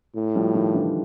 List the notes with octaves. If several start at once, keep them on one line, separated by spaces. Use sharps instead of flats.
A2
F3 G3
D#3 F3
D3 E3